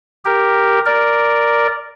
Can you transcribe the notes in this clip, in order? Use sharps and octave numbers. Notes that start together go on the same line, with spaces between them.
G4 A#4
A#4 D5